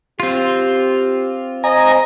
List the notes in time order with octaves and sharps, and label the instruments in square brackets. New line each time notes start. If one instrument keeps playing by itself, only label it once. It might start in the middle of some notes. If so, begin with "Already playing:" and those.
[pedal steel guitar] C4 F4 [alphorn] G4
[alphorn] C5 [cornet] D#5 [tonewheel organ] G#5 A#5